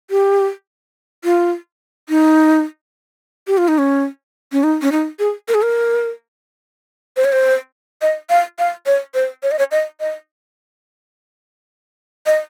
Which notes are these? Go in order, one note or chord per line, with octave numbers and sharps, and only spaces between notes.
G4
F4
D#4
G4
F4
D#4
C#4
C#4
D#4
C#4
D#4
G#4
A#4
G#4
A#4
C5
C#5
C5
D#5
F5
F5
C#5
C5
C#5
D#5
C#5
D#5
D#5
D#5